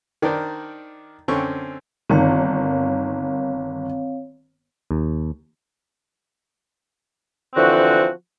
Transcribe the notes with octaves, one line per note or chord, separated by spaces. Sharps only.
D#3 D4 A#4 C5 D5
F#2 D3 C4 C#4 C#6
G1 D#3 C4 C#5 F5
D#2
D3 E3 F3 C4 F#4